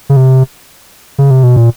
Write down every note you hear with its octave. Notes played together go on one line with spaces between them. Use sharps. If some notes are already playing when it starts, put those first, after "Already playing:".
C#3
C3
C#3
C3
B2
A#2